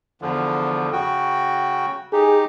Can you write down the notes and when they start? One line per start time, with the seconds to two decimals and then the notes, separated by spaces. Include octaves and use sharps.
0.22 E2 D3 F3
0.93 C#3 F#4 G5
2.13 D#4 G4 G#4